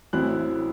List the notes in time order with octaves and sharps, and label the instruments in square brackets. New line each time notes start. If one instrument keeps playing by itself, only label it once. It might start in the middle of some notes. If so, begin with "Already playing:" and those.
[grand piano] A1 A2 F#3 C4 E4 F#6